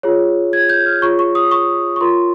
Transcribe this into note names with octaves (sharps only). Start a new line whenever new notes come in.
F4 G#4 C#5
G#6
G6
F6
F4 G#4 C#5 C#6
C#6
D#6
C#6
C#6
F4 A#4 C#5 C6